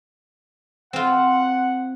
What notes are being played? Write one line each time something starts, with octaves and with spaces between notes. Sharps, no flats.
C4 F4 F#5